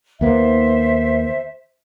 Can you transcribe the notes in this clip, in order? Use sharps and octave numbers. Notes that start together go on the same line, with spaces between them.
D#2 A#3 B3 C5 E5